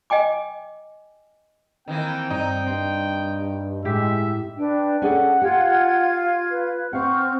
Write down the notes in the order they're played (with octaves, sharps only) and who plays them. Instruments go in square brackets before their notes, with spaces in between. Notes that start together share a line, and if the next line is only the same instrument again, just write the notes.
[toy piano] D#5 G5 G#5 D6
[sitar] D#3 E3 A#3 [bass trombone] C4 [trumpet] G5
[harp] G2 [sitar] D#4
[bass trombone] G2 [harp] C4
[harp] A2 G4 B6 [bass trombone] G#3 [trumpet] E5
[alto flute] D4 [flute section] B4 G5
[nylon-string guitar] C#4 G#4 D5 [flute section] A4 [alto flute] F#5
[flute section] F4 F5 G#6 [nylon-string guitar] G4
[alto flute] B4
[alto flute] C4 [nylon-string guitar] F5 F#5 [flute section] C#6 F6 G6